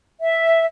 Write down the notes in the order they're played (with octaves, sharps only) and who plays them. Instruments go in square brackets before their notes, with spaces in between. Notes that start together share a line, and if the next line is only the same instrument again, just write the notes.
[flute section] E5